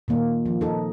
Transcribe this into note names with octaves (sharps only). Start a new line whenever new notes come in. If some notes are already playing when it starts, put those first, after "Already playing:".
A#2 D#3 A#3
F3
D#4 A4